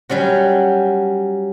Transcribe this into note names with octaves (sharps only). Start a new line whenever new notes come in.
F#3 G3 C#4 F#4